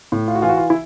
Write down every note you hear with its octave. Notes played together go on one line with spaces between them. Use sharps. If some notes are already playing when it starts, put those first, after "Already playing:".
A2
F4
F#4
E3 F4
F#4
F4
E4